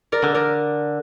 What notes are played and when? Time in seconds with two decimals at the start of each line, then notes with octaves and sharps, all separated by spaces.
0.12 A#4 D5
0.24 D3
0.35 A#4 D5